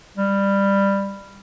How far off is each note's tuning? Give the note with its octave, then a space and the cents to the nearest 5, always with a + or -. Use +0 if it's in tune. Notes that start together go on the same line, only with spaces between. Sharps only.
G3 +15